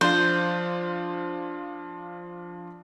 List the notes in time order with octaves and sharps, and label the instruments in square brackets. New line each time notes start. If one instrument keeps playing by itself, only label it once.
[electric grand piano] F3 D4 F4 [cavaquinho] C5